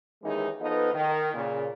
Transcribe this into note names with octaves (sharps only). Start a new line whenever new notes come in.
D#2 D#3 E3 G#3 C#4 D#4
F3 B3 D#4 A4 B4 D#5
D#3
A#2 C#3